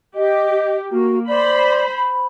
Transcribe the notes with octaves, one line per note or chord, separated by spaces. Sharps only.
G4 D#5
A#3 F#4
C5 D5 B5
B5